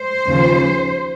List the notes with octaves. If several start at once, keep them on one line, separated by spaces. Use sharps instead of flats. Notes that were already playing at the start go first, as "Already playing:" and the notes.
Already playing: C5
D#2 C#3 F3